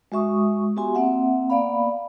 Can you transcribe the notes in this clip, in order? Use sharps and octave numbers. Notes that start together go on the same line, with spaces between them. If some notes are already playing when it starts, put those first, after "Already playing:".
G#3 F#4 E5 C#6 D#6
B3 F#4 G4 E5 G#5 C6
A#3 C4 E5 F#5
A#3 B3 D5 F5 B5